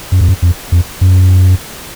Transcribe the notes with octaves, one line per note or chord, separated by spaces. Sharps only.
F#2
F2
F#2
F2
F2
F#2